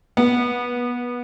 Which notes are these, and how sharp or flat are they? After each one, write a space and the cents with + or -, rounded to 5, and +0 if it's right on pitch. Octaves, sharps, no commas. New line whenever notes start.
B3 -20